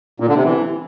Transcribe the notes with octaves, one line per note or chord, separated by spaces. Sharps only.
A#2
D3
C3
E3